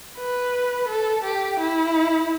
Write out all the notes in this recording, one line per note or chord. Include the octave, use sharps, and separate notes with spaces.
B4
A4
G4
E4